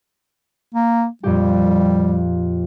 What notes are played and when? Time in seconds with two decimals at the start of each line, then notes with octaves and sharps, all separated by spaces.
0.75 A#3
1.23 F2 A#2 G3 G4